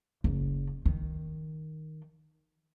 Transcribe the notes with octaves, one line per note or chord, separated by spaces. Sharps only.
F#1
D#3